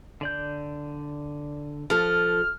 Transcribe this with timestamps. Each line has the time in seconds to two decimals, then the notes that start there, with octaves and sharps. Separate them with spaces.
0.21 D3 D5 G6
1.90 F3 A4 F6